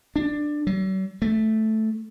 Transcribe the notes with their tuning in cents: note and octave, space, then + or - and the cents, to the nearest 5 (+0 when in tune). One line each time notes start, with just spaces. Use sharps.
D4 +10
F#3 +45
A3 -5